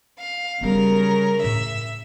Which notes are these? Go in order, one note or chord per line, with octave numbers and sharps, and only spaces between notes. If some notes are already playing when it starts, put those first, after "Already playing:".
F5
C#3 G3 B3 A#4
A2 E5